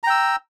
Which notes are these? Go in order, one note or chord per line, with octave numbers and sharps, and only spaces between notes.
G5 A#5 E6